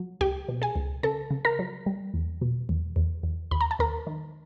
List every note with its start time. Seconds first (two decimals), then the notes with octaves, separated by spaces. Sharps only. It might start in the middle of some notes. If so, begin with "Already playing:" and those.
Already playing: F#3
0.21 C#2 G4 G5
0.48 B2
0.62 G#4 G#5
0.76 C#2
1.03 C#3 A4 A5
1.31 C#3
1.45 A#4 A#5
1.59 F#3
1.86 G3
2.14 E2
2.41 B2
2.69 E2
2.96 E2
3.23 E2
3.51 D#2 B5
3.61 A#5
3.71 A5
3.79 D#2 A#4 A#5
4.07 D#3